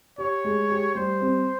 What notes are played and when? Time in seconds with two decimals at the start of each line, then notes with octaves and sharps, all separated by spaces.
0.18 G4 C#5
0.44 G#3
0.70 G4
0.95 G3 C5
1.21 C4